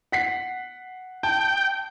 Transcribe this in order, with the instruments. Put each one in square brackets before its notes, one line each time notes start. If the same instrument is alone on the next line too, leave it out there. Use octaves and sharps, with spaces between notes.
[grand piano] F#5 B6 C7
[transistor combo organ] G5 [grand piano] A5